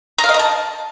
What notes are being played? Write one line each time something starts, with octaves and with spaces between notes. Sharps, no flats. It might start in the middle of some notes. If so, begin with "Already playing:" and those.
A#5
F5
D#5
A#5
A5